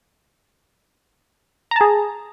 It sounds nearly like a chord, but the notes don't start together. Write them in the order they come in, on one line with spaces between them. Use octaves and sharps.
A#5 A5 G#4